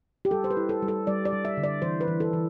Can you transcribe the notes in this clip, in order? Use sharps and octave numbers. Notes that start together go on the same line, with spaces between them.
G4
G3 A4
C5
B4
E4
A4
G3
A4
G3 D5
D5
G3
E5
D3
D5
E3 C5
B4
E3
A4
E3